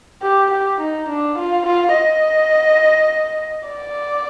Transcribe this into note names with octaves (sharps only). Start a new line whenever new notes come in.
G4
G4
D#4
D4
F4
F4
D#5
D5